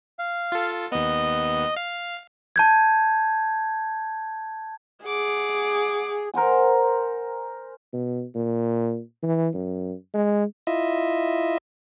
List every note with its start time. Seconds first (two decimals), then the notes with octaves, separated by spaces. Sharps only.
0.19 F5
0.52 F4 A4
0.92 D#2 B3 D#5
1.76 F5
2.56 A5 G6 G#6
5.05 G#4 F#5 D6
6.34 A#4 C5 F#5 G#5
7.93 B2
8.35 A#2
9.23 E3
9.54 F#2
10.14 G#3
10.67 E4 F4 D#5 E5